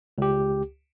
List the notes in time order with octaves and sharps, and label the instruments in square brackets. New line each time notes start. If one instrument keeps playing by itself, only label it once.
[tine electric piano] C#2 G4